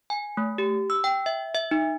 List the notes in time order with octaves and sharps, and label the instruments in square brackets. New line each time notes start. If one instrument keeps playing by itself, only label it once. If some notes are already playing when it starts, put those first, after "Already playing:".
[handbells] G#5
A3
G4
E6
G5
E5
E5
D#4